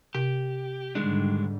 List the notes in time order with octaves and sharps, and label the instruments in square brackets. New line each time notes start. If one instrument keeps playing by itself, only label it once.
[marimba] C3 [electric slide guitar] G4
[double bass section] G#2 D3 G3 [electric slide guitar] D#3 G#3 D4